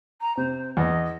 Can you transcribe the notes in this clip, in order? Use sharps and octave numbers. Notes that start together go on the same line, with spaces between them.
A#5
C3 C5
E2 D#5